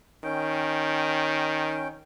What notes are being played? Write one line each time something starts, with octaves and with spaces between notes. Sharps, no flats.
D#3 C#4 G5